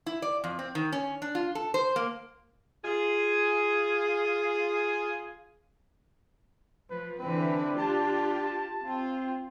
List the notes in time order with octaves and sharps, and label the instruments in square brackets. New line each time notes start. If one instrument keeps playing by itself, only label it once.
[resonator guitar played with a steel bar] E4
D5
F2
C4
D#3
C#4
D4
F4
A4
C5
A#3
[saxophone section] F4 G#4
[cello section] F3 [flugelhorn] B4
[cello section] D3 E3 B4 [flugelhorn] C4 [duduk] D4
[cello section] F4 G4 [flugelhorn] A5
[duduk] C4 [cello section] F4